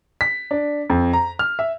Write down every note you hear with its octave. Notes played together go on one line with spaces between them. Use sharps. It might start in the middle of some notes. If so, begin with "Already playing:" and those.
B6
D4
F2
A#5
F6
E5